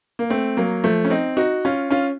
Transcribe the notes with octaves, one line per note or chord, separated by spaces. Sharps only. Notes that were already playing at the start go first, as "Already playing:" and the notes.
A#3
A3 C4
F#3 A#3
F3 A3
C#4
C4 D#4
D#4 F#4
C#4 F4
C#4 F4